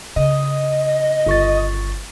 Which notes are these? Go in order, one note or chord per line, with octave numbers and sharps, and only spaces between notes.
C#3 D#5
G1 C#6 A6